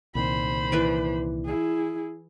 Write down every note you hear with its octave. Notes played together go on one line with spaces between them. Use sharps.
C2 A#2 D#3 C5 B5
E3 B4 D5
E4 G#4